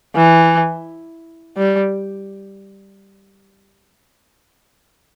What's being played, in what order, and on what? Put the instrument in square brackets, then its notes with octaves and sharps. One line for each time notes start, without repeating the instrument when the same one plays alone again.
[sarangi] E3
G3